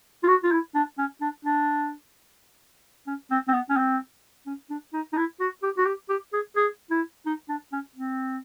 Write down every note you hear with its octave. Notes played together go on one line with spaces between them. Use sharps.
F4
F#4
F4
E4
D4
C#4
D4
D4
C#4
C4
C4
B3
C#4
C4
C#4
D4
D#4
D#4
E4
F#4
G4
F#4
G4
G4
G#4
G#4
E4
D#4
D4
C#4
C4